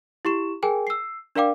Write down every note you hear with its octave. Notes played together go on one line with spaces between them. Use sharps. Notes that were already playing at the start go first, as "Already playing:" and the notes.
E4 G4 C#6 E7
G#4 A#4 G5 G#5
E6 C7
D4 A#4 D5 F5 G5 D6